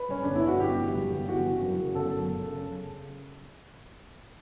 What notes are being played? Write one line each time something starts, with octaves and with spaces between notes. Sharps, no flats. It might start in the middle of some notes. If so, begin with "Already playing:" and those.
Already playing: B4
G2 C#4
G1 D4
E4
G1 F#4
G1 G4
E3
G2
G1
E3 F#4
C#3
F#2
C#3
G1 A4
F#2
F#2
C#3